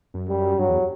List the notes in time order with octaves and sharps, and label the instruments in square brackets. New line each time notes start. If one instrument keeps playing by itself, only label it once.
[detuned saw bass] F#2
[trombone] G3
[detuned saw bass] G2 [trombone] F#3
[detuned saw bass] E2